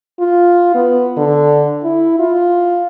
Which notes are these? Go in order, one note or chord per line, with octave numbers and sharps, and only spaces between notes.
F4
B3
D3
E4
F4